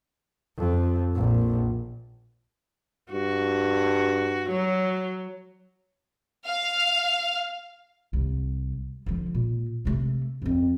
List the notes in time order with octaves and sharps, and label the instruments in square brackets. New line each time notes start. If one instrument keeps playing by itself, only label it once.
[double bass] F2
A#1
[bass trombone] G2 [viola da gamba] F#4
[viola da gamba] F#3
[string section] F5
[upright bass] C2
D3 F3
A#2
C3 A3
D#1 F2